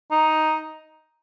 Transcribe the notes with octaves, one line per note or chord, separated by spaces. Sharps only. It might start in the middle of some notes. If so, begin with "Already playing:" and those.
D#4